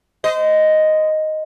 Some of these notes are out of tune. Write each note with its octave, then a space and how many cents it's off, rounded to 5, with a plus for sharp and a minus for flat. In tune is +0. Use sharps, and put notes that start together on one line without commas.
C5 -30 D#5 +0